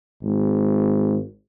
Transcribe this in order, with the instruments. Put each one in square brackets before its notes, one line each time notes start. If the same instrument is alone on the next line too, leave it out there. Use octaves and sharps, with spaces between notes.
[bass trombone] G#1